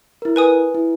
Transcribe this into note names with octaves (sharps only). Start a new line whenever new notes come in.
E4 A#4
B4 G#5 D#6
E4